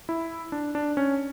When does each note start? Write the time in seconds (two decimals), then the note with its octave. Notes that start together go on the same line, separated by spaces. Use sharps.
0.09 E4
0.52 D4
0.75 D4
0.97 C#4